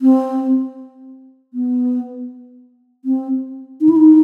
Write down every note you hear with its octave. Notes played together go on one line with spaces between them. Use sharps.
C4
B3
C4
D#4
E4
D#4